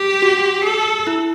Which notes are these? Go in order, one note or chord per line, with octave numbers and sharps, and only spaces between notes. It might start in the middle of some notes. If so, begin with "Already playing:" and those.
Already playing: G4
F#4
A4
E4